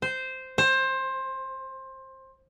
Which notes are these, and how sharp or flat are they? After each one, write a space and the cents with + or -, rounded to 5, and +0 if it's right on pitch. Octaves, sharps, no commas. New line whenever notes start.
C5 -10
C5 +20